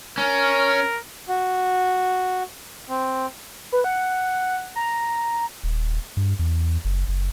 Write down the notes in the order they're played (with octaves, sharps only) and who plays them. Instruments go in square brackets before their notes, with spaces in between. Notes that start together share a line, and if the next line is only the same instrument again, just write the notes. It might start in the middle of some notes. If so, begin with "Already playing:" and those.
[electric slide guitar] C#4 [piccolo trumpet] A#4
[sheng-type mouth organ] F#4
C4
[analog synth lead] B4
F#5
A#5
[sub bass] D#1
G2
E2
F#1
F#1